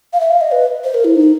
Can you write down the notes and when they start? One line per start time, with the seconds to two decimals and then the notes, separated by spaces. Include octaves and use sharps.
0.13 F5
0.20 E5
0.31 F5
0.41 D#5
0.52 B4
0.84 C5
0.94 A#4
1.04 E4
1.16 D#4